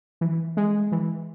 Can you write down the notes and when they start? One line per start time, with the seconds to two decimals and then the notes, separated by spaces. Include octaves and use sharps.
0.21 E3
0.57 G#3
0.92 E3